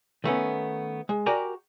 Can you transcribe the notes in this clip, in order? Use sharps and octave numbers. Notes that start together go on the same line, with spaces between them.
D#3 A3 B3 C#4
G#3
F#4 G4 A#4 D5 G#5 A#5